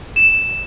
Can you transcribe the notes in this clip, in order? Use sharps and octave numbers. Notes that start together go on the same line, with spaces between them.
E7